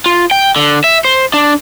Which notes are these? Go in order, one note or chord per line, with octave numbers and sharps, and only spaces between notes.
F4
G5
D3
E5
C5
D4